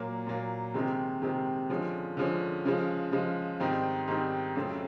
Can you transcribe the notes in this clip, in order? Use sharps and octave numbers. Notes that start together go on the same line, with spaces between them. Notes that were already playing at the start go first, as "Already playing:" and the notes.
Already playing: A#2 F#3 A#3
A#2 F#3 A#3
C3 D#3 G#3 C4
C3 D#3 G#3 C4
D3 F3 G#3 C#4
D3 F3 G#3 C#4
C#3 F3 G#3
C#3 F3 G#3
G#2 D#3 G3 C4 D#4
G#2 D#3 G3 C4 D#4
F2 C#3 F#3 A3 C4